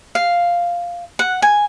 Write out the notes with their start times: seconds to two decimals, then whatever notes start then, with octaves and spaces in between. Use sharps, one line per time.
0.15 F5
1.19 F#5
1.42 G#5